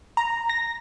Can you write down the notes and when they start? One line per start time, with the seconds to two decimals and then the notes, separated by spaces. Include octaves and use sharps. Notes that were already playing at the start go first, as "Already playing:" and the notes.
0.17 A#5
0.49 A#6